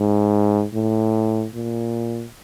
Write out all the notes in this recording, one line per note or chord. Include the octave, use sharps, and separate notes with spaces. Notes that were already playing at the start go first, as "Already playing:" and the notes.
Already playing: G#2
A2
A#2